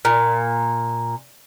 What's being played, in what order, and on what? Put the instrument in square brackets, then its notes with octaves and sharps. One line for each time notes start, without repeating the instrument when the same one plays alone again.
[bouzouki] A#2